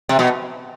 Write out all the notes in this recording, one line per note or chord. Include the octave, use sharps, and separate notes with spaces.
C3
B2